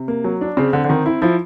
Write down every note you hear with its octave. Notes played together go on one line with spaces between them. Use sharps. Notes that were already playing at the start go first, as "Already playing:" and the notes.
Already playing: C3
A#3
F#3
D4
C#3 C4
D3 C4
D3
D#3 C4
E4
F3 E4